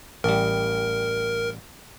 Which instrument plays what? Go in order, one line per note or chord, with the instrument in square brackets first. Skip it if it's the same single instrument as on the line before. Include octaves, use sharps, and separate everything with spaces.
[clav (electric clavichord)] A1 G3 [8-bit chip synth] A#4